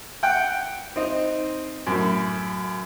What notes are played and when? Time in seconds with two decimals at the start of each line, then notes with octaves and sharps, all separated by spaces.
0.23 F#5 G5
0.96 C4 D#4
1.87 F#2 A2